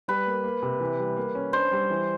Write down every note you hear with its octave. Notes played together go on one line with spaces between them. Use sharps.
G3 B4
A#3
A#3
C3
E3
G3
A#3
C#4
D4 C5
G3
E3